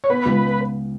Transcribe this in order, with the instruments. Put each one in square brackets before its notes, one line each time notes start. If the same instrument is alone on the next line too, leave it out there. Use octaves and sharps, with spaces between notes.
[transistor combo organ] C#5
[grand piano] B3 [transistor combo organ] B4
[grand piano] C#2